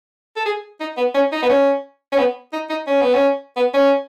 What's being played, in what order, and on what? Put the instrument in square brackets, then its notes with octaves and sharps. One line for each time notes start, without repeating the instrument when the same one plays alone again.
[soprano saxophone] A4
G#4
D#4
B3
C#4
D#4
B3
C#4
C#4
B3
D#4
D#4
C#4
B3
C#4
B3
C#4